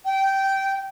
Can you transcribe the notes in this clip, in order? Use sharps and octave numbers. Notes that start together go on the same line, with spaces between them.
G5